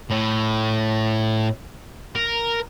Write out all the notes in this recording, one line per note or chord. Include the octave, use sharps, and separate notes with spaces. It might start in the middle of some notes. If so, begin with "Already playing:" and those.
A2
A#4